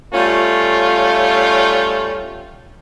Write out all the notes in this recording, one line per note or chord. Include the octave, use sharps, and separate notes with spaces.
G3 A3 C#4 F4